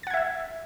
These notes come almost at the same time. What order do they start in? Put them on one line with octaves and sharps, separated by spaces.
A6 F#5 G#6 E5 E6